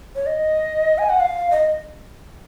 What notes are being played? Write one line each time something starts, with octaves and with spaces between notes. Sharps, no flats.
C#5
D#5
G#5
F#5
F5
D#5